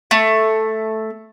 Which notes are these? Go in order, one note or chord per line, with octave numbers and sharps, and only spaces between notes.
A3